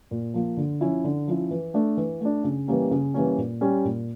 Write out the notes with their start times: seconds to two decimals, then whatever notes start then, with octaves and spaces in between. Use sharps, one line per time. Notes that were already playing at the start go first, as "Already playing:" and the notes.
0.11 A#2
0.34 F3 A#3
0.57 D3
0.81 F3 C#4 E4
1.04 D3
1.28 F3 C#4 E4
1.51 E3
1.74 A3 D4
1.97 E3
2.21 A3 D4
2.44 C#3
2.68 E3 G3 A#3 C#4
2.91 C#3
3.14 E3 G3 A#3 C#4
3.38 A#2
3.61 G3 C#4
3.85 A#2